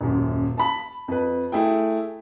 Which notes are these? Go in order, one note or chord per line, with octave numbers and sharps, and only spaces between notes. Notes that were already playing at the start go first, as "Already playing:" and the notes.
D#1 F#2
A5 B5
F2 B4
A3 E4 G#4 G5